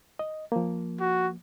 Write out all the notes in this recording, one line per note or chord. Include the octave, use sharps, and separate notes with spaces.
D#5
F3 A#3
F#4